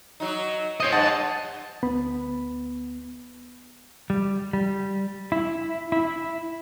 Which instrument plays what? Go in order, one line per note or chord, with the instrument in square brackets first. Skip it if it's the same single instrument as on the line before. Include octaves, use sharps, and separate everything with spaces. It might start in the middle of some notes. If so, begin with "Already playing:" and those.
[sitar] F#3 D#4
[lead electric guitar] C5 D#5 [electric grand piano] C#5 D#6
[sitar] G2 [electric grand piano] D#5 F#5 [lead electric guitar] A5
[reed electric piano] D2 B3 B5
[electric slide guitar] G3
G3
E4
E4